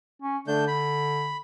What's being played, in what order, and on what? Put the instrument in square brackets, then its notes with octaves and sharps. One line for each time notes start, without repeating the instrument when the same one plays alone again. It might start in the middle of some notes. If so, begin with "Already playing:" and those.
[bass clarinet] C#4
[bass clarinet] D3 [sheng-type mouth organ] A3 D4 G6
[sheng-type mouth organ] B5